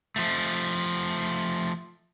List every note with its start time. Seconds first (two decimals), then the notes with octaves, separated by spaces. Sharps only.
0.16 F3 A3